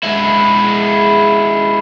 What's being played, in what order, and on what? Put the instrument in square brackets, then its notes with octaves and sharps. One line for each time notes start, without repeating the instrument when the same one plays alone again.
[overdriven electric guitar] G#3 E4